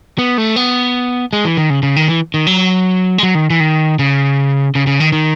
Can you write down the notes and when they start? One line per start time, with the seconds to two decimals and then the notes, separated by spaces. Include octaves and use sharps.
0.18 B3
0.38 A3
0.56 B3
1.33 G#3
1.45 E3
1.57 D#3
1.70 C#3
1.83 C#3
1.96 D#3
2.08 E3
2.34 D#3
2.47 F#3
3.18 G#3
3.23 F#3
3.35 D#3
3.50 E3
3.60 D#3
3.99 C#3
4.75 C#3
4.87 C#3
5.00 D#3
5.12 D#3